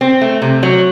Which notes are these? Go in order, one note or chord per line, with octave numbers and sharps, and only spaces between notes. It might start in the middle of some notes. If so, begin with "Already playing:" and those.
C4
A3
C3
F#3